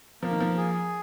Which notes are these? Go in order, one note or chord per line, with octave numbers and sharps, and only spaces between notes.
F3 A#3
D#3
F3
G#4